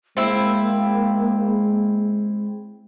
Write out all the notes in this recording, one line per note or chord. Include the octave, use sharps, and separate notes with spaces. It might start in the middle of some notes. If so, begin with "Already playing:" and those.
G#3 A#3 C4 E4